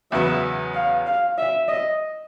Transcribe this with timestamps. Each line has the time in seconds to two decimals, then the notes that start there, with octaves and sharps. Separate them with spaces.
0.12 E2 C#3 F#3 B3 E5
0.74 F5
1.07 F5
1.38 E5
1.68 D#5